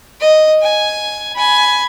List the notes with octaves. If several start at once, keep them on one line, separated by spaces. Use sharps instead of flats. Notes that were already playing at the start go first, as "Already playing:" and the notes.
D#5
G#5
G#5 B5